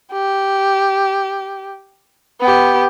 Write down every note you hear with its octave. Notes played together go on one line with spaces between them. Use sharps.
G4
B3 G4